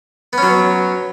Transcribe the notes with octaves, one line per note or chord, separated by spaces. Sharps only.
F#3 B3 C#4